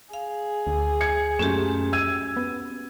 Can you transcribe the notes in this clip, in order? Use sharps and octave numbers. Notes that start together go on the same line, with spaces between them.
G#4 F5
D2
G#6 C#7
F#2 A#2 A3 C#4 F#4 G4
E6 G#6 D#7
B3